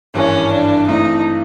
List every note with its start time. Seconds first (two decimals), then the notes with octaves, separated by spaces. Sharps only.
0.14 G#1 G2 E3 G3 A#3 C#4
0.52 D4
0.88 G2 E3 A3 C4 D#4 E4